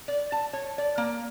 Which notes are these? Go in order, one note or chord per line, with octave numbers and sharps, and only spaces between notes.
D5
A5
C#5
D5
A#3